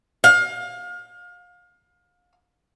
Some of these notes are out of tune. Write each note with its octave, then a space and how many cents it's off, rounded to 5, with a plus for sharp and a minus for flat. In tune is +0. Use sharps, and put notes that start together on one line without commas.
F5 +30